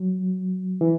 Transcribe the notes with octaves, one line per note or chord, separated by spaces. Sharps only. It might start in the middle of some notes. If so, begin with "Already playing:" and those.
Already playing: F#3
E3